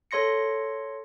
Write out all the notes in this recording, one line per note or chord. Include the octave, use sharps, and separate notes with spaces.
A4 C#5 C6 A#6 C#7